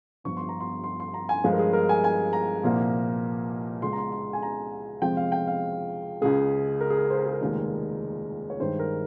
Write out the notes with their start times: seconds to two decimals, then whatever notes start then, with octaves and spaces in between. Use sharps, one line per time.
0.24 G1 G2 F3 C#6
0.37 C6
0.49 A#5
0.60 C6
0.84 C6
1.00 C6
1.14 A#5
1.29 G#5
1.44 G2 F3 G#3 F5
1.53 A#4
1.59 G#4
1.73 A#4
1.89 G#5
2.04 G#5
2.33 A#5
2.63 C2 A#2 F3 A#3
3.82 C#2 C#3 G#3 C6
3.93 A#5
3.98 C6
4.12 C6
4.33 G#5
4.43 A#5
5.02 F2 C3 F3 G#3 G5
5.17 F5
5.32 G5
5.47 F5
6.21 C#2 C#3 G#3 G#4
6.81 A#4
6.90 G#4
6.98 A#4
7.10 C5
7.18 A#4
7.26 G#4
7.33 A#4
7.41 F1 D#2 D#3 G#3
8.50 C#5
8.60 G2 D#3 G#3 C5
8.79 A#4